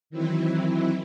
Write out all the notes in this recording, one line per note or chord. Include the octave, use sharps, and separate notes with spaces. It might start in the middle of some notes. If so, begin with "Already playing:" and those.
D#3 E3 F#3 C4 E4